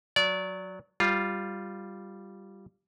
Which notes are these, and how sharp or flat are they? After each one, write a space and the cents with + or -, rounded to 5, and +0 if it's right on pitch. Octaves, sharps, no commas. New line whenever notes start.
F#3 -10 D5 -25
G3 +0 F4 +0